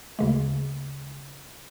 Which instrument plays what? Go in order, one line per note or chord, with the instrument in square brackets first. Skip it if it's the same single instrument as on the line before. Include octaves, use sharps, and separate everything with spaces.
[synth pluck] D2 C#3 G#3